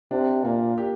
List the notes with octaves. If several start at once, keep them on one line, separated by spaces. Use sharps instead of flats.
C3 D4
A#2 A#3
G4